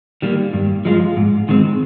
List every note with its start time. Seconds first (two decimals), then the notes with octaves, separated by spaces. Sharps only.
0.22 D#3 G3 A#3
0.53 G2
0.85 F3 G#3 D4 F4
1.17 G#2
1.49 D#3 G#3 C4